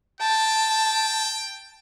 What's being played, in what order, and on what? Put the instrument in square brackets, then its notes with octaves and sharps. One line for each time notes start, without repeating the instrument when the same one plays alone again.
[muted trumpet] G5 [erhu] A5